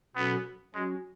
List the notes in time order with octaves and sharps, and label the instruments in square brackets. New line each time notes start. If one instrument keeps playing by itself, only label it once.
[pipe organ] B2 F#3 C#4 F#4 A4 [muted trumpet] B3
[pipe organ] F#3 C#4 F#4 [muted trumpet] G#3